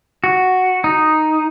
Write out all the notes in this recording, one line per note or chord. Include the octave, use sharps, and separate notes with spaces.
F#4
D#4